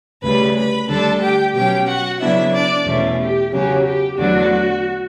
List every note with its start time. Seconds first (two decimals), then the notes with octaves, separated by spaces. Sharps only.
0.22 D2 C#3 G3 B4 B5
0.55 B4 B5
0.88 D2 D3 G3 D4 A4 A5
1.21 G4 G5
1.54 B2 F#3 C#4 G4 G5
1.87 F#4 F#5
2.20 C#3 F#3 B3 D4 E4 E5
2.52 D4 D5
2.85 E2 B2 A3 C#4
3.19 G4
3.51 E2 C#3 F#3 C#4 G4
3.85 G4
4.17 E2 D3 F#3 A3 D4 F#4